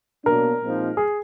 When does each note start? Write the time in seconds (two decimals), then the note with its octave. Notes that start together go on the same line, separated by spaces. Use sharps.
0.25 B2 F#3 A#3 D4 A#4
0.61 A#2 F3 G#3 C4 D#4
0.97 G#4